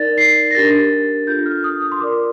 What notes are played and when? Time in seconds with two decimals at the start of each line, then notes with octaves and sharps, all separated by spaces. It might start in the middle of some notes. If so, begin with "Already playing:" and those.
Already playing: D#4 A#4 D5 A6
0.18 C7
0.51 A#6
0.54 D4 G4 A#4 A6
1.27 D4 F4 A4 G6
1.46 F6
1.64 D#6
1.82 D#6
1.92 C6
2.00 F4 A#4 D5 D6